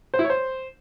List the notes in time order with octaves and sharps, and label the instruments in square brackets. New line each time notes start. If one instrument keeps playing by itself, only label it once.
[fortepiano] C5
E4
C#5
C5